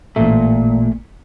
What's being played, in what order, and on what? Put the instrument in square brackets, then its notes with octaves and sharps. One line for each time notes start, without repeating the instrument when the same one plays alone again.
[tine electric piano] A1 A3 [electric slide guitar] A#2